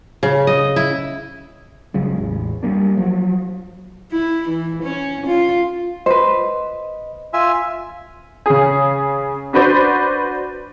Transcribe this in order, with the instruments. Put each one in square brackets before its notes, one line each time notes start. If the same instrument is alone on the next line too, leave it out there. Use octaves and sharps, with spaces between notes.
[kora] C#3
D#5
E4
[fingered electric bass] G#1 C#3 F#3 G#3
A1 E2
G3 A3 A#3 D4
F3 F#3
[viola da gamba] E4
E3
C#4
F4
[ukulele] B4 C5 [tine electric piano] D#5
[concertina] F4 E5 G#5
[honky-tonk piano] C#3 G#4
D4 F#4 B4 C5 D5